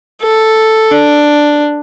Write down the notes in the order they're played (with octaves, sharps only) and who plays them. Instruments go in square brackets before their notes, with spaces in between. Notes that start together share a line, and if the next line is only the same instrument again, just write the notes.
[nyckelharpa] A4
D4